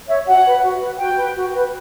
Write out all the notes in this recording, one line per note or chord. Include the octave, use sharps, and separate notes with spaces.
C#5 E5
F#4 F#5
B4
F#4
B4
F#4 G5
B4
F#4
B4